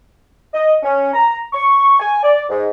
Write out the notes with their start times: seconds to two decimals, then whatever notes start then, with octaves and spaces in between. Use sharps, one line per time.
0.54 D#5
0.83 C#4
1.13 A#5
1.53 C#6
2.00 G#5
2.23 D5
2.50 G#2